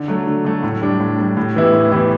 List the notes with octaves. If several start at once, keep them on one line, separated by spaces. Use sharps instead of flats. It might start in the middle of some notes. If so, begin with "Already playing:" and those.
Already playing: D3
F#3 A3
D3
F#3 A3
A2
G3 D4
A2
G3 D4
A2
E3 B3 E4 G4
A2
E3 B3 E4 G4